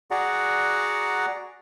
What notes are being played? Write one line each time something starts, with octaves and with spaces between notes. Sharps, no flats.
F#4 G#4 D5 F#5 A#5